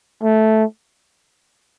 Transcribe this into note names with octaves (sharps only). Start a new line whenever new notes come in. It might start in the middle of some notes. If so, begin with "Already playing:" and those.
A3